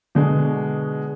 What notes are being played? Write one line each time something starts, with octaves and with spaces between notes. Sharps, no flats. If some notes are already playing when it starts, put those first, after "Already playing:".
B2 D3 G#3 D4